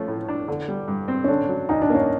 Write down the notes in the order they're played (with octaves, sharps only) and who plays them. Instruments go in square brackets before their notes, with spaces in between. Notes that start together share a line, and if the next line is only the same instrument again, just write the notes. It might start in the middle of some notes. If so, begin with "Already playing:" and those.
Already playing: [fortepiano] F3 A3 [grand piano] C#4
[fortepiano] A2
D4
D3
G3
G2
C4
[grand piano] C#4
[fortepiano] D3 [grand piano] D4
[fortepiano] F#3
[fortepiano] D2 [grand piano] D#4
[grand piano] D4
[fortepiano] A#3 [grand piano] C#4